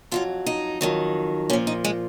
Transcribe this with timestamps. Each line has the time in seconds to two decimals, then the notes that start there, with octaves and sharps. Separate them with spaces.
0.12 F2 D#3 F#3 F4
0.46 D#4
0.81 F2 D#3 F#3
1.50 A#2 F3 C#4
1.67 D#4
1.85 G#3